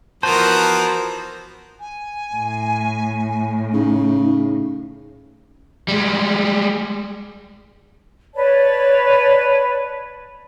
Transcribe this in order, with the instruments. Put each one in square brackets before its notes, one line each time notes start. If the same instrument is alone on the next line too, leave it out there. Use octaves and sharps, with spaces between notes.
[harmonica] E3 F3 B3 [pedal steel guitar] F#4 C5 [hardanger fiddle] A#4 [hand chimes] A5
[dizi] G#5
[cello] A2
[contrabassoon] C#3 [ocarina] D#4
[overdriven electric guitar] G3 G#3
[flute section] B4 C#5 D5 A5